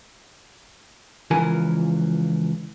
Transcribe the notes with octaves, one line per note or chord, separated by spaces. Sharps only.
C#2 E3 F3 A#4 G#5